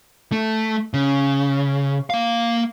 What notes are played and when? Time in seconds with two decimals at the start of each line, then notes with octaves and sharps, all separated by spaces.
0.32 A3
0.94 C#3
2.10 A#3 F5